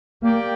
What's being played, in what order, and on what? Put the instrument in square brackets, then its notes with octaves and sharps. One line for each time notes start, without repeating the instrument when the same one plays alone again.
[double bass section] A#3 [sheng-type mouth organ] G4 D5 G5